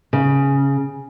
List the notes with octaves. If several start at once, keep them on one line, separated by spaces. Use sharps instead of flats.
C#3